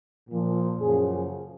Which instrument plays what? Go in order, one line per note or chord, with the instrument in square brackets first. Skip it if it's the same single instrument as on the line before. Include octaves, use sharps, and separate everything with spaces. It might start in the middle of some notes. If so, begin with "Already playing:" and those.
[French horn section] A#2 F3
F#2 C#3 F3 G#4